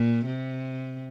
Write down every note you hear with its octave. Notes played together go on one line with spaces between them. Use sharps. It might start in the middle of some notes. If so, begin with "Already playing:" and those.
Already playing: A#2
C3